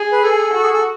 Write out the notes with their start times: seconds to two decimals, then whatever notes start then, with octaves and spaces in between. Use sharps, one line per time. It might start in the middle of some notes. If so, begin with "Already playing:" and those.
Already playing: G#4
0.12 B4
0.23 A4
0.54 F#4
0.63 G#4
0.73 A4